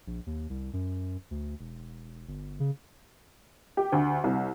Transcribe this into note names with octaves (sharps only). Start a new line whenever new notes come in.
A#1
D#2
C2
F#2
D2
E1
G1
C#3
G4
D2
C2